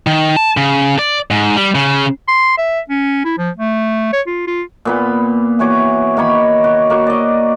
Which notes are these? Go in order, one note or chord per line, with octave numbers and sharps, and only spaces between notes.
D#3
A5
C#3
D5
G#2
G3
C#3
C6
E5
C#4
E4
F3
A3
C#5
F4
F4
A#2 B3 B5
E3 F#4 C#5 D6
D#3 A#3 C#5 B5
F#4
A#3 F#4
D5 D#5